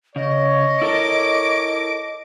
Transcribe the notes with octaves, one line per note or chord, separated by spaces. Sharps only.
C#3 C#5 D#5
E4 A4 A#4 D6 D7